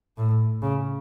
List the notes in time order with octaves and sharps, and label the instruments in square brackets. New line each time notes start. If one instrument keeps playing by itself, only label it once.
[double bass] A2
C#3